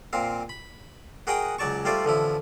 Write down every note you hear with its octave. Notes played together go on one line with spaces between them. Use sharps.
A#2 C4 F5
B5
F#4 G#4 A#4 D#5 F#5 G5
C#2 F#3 D5 A5 C#6
G3 A3 F4 C5 D5
A1 D3 F3 E4